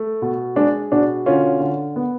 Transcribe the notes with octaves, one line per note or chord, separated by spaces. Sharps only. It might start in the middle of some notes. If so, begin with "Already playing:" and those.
Already playing: A3
B2
G#3 D4
B2 D4
D3 C#4 F4
D3
B3